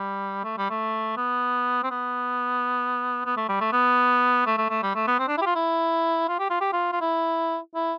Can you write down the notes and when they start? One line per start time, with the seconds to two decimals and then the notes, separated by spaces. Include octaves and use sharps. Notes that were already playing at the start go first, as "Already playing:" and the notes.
Already playing: G3
0.44 A3
0.58 G3
0.70 A3
1.17 B3
1.83 C4
1.91 B3
3.26 B3
3.37 A3
3.49 G3
3.61 A3
3.73 B3
4.46 A3
4.58 A3
4.69 A3
4.83 G3
4.95 A3
5.07 B3
5.19 C4
5.28 D4
5.38 E4
5.41 G4
5.46 F4
5.55 E4
6.28 F4
6.39 G4
6.50 F4
6.61 G4
6.73 F4
6.92 F4
7.01 E4
7.75 E4